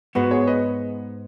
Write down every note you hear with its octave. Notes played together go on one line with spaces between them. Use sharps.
G#2 G#3 B3 F#4 B4
G#4 C#5
B4 D#5